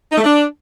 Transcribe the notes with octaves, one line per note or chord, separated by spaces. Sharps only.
D#4
A3
D4